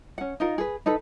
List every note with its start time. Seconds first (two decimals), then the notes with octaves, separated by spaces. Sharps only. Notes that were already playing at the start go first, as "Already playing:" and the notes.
0.18 C#4 F#5
0.40 D#4 F4 A#4
0.58 G#4 B4
0.86 D#4 A4 B4